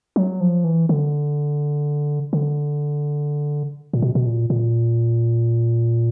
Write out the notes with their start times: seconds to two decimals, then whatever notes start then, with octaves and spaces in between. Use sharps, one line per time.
0.16 F#3
0.41 F3
0.64 E3
0.89 D3
2.33 D3
3.93 A#2
4.02 B2
4.15 B2
4.26 A#2
4.50 A#2